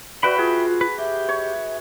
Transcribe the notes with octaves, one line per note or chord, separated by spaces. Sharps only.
F#4 B4 D5 E5 F#5 G5 B5
F4 G#4
B4
G4 E5
C#5